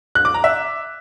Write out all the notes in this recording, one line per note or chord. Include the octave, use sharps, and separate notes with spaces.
F#6
D6
A#5
E5